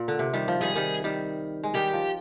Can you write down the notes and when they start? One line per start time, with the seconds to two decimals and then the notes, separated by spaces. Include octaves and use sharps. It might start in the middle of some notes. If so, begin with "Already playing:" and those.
Already playing: A#2
0.08 D3
0.19 C3
0.33 D#3 G3
0.48 F3
0.61 D#3 G3 G#4
0.75 D#3 G3
1.04 D#3 G3
1.63 G#3
1.74 D#3 G3 G4
1.93 F3